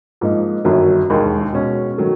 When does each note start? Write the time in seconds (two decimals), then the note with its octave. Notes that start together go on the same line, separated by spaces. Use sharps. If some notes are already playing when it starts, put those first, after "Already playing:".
0.21 G#2 F3 A#3 D#4
0.65 G1 F#2 D#3 F#3
1.10 E1 D#2 D#3 G#3
1.53 B2 G#3 C#4
1.98 D#3 F#3 A3